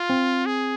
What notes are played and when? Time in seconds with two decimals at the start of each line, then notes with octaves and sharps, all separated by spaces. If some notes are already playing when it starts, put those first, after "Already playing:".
Already playing: F4
0.10 C4
0.46 G#4